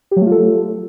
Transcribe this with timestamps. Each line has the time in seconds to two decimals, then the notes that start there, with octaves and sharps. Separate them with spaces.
0.11 G4
0.16 F#3
0.22 A3
0.27 F4
0.32 A4